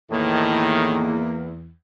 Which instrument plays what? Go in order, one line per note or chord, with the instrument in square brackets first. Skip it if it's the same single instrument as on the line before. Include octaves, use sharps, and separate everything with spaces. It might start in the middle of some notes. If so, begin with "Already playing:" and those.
[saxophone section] E2 [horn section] A2 D#3 [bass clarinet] A#3